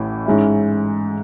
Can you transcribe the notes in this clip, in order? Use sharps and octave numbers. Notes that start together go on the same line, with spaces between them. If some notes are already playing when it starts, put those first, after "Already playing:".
Already playing: A1 A2 E3
G#2 G#3 C#4 E4